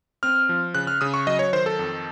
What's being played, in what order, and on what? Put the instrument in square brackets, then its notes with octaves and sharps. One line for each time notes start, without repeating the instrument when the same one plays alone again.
[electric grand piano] C4 F6
F3
C#3 F#6
F6
C#3 D#6
C#6
F#3 D#5
C#5
D#3 C5
A4
F2